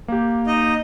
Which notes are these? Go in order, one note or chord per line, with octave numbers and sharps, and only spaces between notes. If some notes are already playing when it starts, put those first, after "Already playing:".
A#3 G4
D#4 D#5